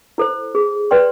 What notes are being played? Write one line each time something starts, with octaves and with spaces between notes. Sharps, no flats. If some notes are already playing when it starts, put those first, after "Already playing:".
E4 A4 C5
G#4
B4 D5 G5 C6